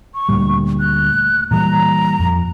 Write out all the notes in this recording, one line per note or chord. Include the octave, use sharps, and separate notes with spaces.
C#6
D2 A#2 G3
F#6
A#2 E3 G3 A#5
F2